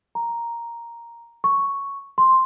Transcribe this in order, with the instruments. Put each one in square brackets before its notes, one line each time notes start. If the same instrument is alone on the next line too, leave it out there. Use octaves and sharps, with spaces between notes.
[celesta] A#5
C#6
C6